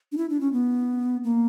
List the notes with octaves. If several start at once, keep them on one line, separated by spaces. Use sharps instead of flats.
D4
E4
D4
C#4
B3
A#3